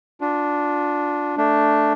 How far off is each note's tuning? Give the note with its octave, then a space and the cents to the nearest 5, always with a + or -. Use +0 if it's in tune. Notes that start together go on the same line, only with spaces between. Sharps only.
D4 -5 F4 +35
A3 +0 D4 +0